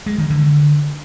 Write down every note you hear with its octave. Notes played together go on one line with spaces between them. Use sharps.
G#3
D#3
D3